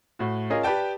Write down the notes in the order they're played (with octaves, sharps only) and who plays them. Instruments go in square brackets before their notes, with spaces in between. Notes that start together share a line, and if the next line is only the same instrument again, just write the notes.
[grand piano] A2 F#4
C#4 F4 G#4 A#4 D#5
G4 B4 D5 G5 A5